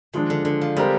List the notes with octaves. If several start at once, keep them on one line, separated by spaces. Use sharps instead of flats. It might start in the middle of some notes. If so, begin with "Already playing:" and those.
D#3 F3 G#3 D4
D3
D3
F3
G3 G#3 C4 G4 A#4